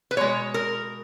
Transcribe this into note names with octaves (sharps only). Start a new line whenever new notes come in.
B4
B2 G#3 C#5
A#4